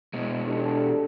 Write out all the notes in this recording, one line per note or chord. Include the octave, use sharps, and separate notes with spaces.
B2 G#3
D4 G4 A4